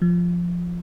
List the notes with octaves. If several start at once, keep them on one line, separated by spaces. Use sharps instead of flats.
F3